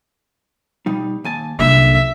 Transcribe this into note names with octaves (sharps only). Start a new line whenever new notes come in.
B2 G3 D#4
D#2 G#5 A5
C2 F#2 A#2 D3 E5